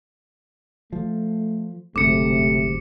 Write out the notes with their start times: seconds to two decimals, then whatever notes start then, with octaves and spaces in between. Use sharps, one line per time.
0.93 F3 A3
1.96 F#1 D2 G#2 C3 A3 D6 C#7